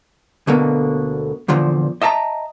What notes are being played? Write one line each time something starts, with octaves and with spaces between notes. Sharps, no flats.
D2 B2 D3 A#3
E2 A#2 D3 F3
D#5 E5 A5 A#5